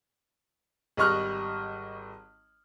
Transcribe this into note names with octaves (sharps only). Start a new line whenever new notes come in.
G#1 G3 D#5 C#6 F6 F#6